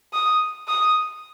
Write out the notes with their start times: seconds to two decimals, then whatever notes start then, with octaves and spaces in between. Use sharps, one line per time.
0.13 D#6
0.68 D#6